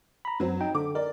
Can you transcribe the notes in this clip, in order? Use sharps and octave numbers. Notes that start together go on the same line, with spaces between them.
A#5 B5
F#2 F#3 C4
D#4 G5
D3 D6
A#4 D5